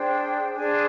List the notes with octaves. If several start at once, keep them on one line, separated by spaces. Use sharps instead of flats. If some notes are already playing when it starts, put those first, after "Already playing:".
Already playing: D4 G#4 C5 G5
D4 G#4 C5 G#5